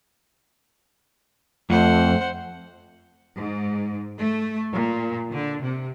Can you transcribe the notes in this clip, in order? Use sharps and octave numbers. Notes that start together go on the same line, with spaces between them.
F2 A3 C5 F#5
G#2
A3
A#2
D3
C3